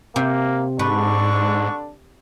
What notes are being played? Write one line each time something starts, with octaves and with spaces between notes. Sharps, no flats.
C3 A#3
G#2 D3 D4 B4 C#6